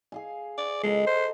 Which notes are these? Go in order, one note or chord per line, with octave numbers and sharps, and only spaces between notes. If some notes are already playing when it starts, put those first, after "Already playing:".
G#4 F5 G#5
D5
G#3 A4 D#5 A#5
C5